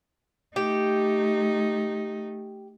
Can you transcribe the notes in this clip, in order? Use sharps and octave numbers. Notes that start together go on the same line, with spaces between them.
A3 D#4 G4